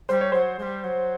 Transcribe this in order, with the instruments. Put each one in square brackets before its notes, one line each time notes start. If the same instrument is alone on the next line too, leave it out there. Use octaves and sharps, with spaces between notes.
[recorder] G3 [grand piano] C5
[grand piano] C#5
[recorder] F#3 [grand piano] C5
[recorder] G#3
G3
F#3